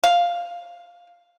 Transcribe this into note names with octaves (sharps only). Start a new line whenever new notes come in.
F5